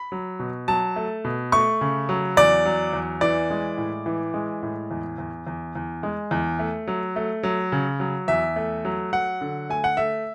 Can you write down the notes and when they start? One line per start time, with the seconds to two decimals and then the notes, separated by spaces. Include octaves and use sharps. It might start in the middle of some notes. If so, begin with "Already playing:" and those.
Already playing: B5
0.12 F#3
0.39 B2
0.68 F#3 A5
0.96 A3
1.25 B2
1.52 A3 C#6
1.81 C#3
2.09 F#3
2.37 E2 D5
2.65 F#3
2.93 E2
3.21 E3 D5
3.50 G#3
3.78 A2
4.06 E3
4.34 G#3
4.62 A2
4.91 E2
5.18 E2
5.47 E2
5.75 E2
6.03 G#3
6.31 E2
6.59 A3
6.87 F#3
7.16 A3
7.43 F#3
7.72 C#3
8.00 F#3
8.28 E2 E5
8.56 A3
8.85 F#3
9.13 F#3 F#5
9.41 D3
9.70 A3 G#5
9.84 F#5
9.97 A3 E5